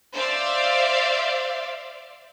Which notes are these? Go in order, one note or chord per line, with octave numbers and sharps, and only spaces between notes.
C5 D5 E5 F5